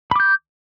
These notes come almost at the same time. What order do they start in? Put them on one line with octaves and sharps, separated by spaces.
B5 D6 G6